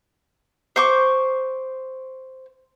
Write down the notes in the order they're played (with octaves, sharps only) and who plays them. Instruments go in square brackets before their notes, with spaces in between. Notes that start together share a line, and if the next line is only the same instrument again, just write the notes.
[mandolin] C5 C#6 D6